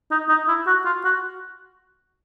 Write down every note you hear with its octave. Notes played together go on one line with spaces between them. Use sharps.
D#4
D#4
E4
F#4
F4
F#4